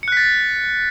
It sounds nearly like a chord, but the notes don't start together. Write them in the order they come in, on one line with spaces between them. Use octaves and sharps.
C#7 F#6 B6 A6